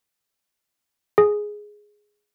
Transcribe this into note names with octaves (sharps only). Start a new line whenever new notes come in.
G#4